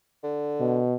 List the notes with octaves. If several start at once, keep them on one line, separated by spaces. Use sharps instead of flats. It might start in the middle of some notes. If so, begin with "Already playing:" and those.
D3
B2